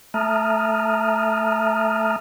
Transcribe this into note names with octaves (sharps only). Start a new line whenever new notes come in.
A3 E5 A5 A#5 D#6 F6